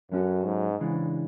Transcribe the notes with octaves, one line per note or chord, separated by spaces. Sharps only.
F#2 F#3 C#4 F#4 A4
G#2
C#3 E3 G#3 D4